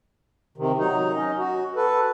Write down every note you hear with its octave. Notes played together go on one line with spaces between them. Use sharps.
C3 D#3
F#3 D#4
C#4 D#5
F#4
A4 B4